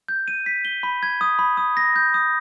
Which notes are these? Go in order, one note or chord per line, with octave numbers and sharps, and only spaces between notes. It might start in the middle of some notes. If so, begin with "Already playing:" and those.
G6
D#7
B6
G7
B5
G#6
D#6
B5
D#6
A#6
G6
D#6